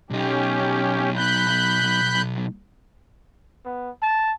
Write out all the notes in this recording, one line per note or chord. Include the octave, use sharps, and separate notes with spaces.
B1 C#4 D#4 G4
B5 F#6 G6
B3
A5